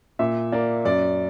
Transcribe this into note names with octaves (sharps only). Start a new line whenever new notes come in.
A#2 E5
A#3 D5
F#2 D5